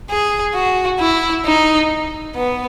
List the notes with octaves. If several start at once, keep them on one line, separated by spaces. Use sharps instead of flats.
G#4
F#4
E4
D#4
B3